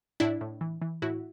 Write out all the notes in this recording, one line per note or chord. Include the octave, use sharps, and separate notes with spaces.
A2 D4 E4
A2
E3
E3
A2 E4 F#4